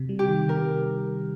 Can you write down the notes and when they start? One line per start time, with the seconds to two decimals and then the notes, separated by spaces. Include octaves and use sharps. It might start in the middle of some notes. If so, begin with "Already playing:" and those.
Already playing: C3
0.09 G3
0.19 G4
0.29 D#3
0.49 C3 A#4